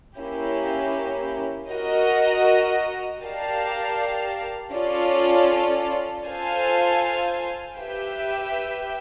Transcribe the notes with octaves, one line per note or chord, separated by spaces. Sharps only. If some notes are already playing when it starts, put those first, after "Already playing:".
A#3 C#4 E4 G4
F#4 A#4 D#5
G4 A#4 D5 F5 A5
C#4 F4 A4 D5
F4 A4 C5 F5 G#5
G4 B4 E5 G5